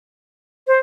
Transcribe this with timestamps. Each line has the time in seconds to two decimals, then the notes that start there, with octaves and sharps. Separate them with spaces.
0.67 C5